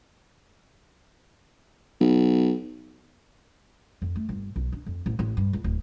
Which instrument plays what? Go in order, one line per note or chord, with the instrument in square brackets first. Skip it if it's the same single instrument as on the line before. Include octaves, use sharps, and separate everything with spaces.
[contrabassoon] B1
[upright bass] F2
A3
G1
B1
D4
F2
A1
A1
G2
C#2
D1